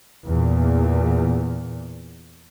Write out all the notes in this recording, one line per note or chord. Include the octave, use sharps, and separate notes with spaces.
E2 A#2